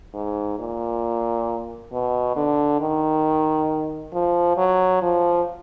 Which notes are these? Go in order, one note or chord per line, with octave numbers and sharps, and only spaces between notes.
G#2
A#2
B2
D3
D#3
F3
F#3
F3